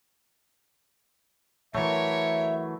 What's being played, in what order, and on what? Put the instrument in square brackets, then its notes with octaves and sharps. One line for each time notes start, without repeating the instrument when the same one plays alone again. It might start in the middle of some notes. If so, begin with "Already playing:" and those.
[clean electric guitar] E3 F#3 A3 [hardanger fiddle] A#4 C#5 [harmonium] E5